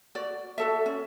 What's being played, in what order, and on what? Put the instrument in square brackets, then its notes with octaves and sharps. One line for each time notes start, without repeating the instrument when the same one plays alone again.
[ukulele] F#4 D5
F#4 A4 E5
C#4